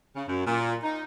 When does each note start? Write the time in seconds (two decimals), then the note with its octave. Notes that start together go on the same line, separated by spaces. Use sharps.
0.16 C#3
0.28 F#2
0.47 A#2
0.84 D#4